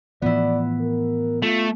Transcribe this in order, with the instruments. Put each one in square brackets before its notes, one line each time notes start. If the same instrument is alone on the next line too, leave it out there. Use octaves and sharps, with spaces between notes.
[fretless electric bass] A2 E3 F3 [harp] B3 E4 [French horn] D5
[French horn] A#4
[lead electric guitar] A3 [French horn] F4